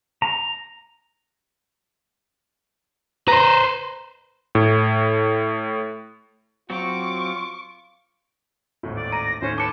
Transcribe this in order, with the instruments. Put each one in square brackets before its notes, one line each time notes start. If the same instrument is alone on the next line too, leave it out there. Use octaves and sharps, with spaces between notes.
[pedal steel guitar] A#5
[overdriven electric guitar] B4 C5 [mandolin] A#5
[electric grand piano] A2
[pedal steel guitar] F#3 C4 F#4 [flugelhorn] F4 [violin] C#6 D6
[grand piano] G#1 D#2 A2
[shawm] D5
[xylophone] A#5 [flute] A#6
[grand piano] D#2 A2 [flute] C#4 [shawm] C5
[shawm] B4 [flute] A5 [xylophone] D6 C#7 D7